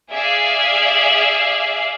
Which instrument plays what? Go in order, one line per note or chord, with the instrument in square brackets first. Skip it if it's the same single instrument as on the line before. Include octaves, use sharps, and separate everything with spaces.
[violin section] G#4 D5 E5 F5